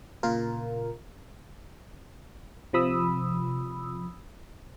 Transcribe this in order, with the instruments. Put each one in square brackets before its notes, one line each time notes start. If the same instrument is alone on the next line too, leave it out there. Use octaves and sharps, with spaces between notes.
[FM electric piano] A#2 C#3 F4 A#4
C3 F3 B5 D#6 E6